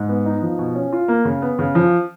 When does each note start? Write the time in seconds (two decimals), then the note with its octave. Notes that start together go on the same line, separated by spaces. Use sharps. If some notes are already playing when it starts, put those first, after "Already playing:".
Already playing: G#2
0.09 B3
0.26 D#4
0.42 F3
0.58 B2
0.75 C#4
0.92 F4
1.08 A#3
1.25 C#3
1.42 B3
1.59 C#3
1.75 F3